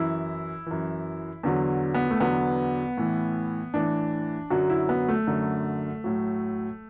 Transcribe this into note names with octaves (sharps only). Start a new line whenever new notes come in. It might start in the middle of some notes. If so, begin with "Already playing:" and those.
Already playing: F#2 E3 E4
F#2 E3
E2 D3 F#3
B3
A3
E2 D3 F#3 B3
A2 E3
A2 E3 D4
F#2 D3 F#3 F#4
E4
B3
A3
F#2 D3 F#3
A2 F#3